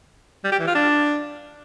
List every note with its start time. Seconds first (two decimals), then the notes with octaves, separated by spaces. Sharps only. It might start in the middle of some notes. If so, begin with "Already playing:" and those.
0.44 G3
0.52 G4
0.60 E3
0.67 F4
0.75 D4